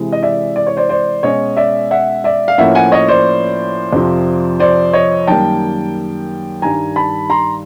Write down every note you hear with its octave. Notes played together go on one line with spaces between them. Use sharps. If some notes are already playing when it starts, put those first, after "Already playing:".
Already playing: C3 E3 G#3
D#5
D5 E5
D5
C#5
C5 D5
C5 D5
B2 G#3 C#4 C#5 D#5
D5 E5
E5 F#5
D5 E5
F5
A2 F3 A#3 C#4 E5 F#5
F#5 G#5
C#5 D#5
C5 D5
F2 C3 F3
C5 D5
C#5 D#5
F#2 D#3 G3 A#3 G5 A5
G2 D#3 G3 G#5 A#5
A5 B5
A#5 C6